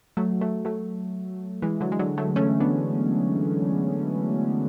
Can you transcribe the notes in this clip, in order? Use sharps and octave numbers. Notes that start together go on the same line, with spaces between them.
F#3 A3
F#3 A3
F#3 A3
E3 G#3
D3 F#3
G#3
D3 F#3
F#3 A3
A3 C#4
B3 D4